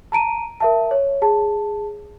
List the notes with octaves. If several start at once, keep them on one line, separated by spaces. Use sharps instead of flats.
A5 A#5 D7 D#7
A#4 E5 A5
C#5
G#4 A5